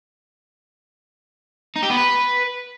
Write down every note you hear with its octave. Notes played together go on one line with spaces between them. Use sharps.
D#4
G4
B3
B4